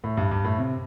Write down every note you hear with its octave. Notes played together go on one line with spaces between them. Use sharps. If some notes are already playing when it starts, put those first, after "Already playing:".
A2
G2
G2
A2
C3